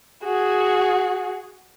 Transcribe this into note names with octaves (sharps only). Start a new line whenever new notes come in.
F#4 G#4